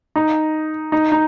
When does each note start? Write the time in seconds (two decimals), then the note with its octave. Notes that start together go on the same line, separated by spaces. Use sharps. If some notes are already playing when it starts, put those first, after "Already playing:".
0.16 D#4
0.92 D#4
1.12 D#4